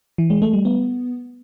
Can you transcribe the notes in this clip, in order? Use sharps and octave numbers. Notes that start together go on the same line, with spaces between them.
E3
G#3
A3
G3
B3